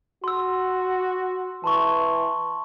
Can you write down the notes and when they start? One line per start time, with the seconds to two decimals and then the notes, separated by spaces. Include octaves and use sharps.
0.24 F#4 C6 E6
1.64 E3 A5 C6 C#6